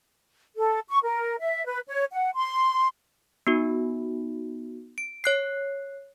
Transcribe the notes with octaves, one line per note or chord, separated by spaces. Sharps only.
A4
C#6
A#4
E5
B4
C#5
F#5
C6
B3 D#4 F#4
D7
C#5 F#6 C7